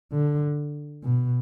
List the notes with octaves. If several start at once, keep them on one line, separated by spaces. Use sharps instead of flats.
D3
B2